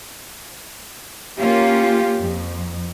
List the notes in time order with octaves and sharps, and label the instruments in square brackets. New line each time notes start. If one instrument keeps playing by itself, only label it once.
[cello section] A#3 C#4 F4 [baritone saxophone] G4
[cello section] F2